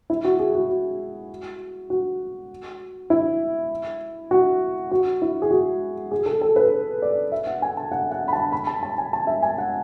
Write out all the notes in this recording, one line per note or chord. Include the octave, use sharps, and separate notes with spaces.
E4
F#4
G#4
F#4
F#4
F#4
E4
F#4
F#4
E4
G#4
F#4
G#4
A4
A4
B4
D5
E5
F#5
G#5
A5
F#5
F#5
B5
A5
B5
A5
A5
G#5
A5
E5
G#5
F#5